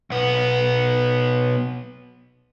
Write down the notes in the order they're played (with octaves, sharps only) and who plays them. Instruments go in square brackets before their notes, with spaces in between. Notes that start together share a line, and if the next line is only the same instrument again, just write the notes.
[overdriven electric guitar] B1 B3